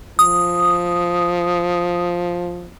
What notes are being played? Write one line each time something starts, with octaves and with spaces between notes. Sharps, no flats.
F3 D#6